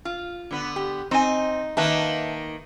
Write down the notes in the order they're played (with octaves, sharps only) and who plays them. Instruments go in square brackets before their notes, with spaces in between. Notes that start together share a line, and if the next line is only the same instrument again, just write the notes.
[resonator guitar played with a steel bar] F4
[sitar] D3 B3
[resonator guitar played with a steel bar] G4
[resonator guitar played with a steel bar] C4 G#5 [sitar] D#4
[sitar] D#3 A#3 [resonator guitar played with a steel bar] B4 E5 A5